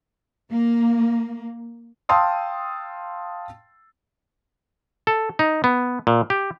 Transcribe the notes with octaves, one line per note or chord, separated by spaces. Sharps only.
A#3
F5 G5 A5 C6 D#6 E6
A4
D#4
B3
A#2
G4